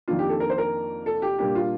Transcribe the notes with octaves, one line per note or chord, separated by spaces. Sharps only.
F2 D#3 A#3 D4 F4
G4
A4
A#4
C5
A#4
A4
G4
A#2 G3 A#3 D4 G4
F4